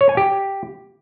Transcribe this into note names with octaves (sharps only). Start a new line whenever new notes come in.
C#5
G#5
G4